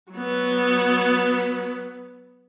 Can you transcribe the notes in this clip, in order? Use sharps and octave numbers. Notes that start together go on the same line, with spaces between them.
F#3 B3